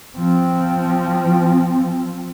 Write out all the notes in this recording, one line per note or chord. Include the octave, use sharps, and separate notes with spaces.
F3 C4